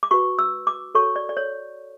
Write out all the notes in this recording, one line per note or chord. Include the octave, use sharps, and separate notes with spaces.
D6
F#4 B4 C#6
E6
D6
F#4 A4 C#5 C#6
D5
D5
C#5